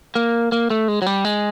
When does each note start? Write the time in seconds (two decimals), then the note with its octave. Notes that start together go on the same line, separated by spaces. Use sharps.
0.15 A#3
0.52 A#3
0.70 A3
0.88 G#3
1.02 F#3
1.06 G3
1.25 G#3